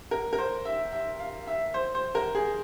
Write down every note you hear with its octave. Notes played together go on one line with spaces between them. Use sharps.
A#4
A#4
C5
E5
E5
F5
E5
C5
C5
A#4
G#4